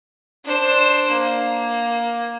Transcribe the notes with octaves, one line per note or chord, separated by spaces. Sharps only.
D4 C5
A#3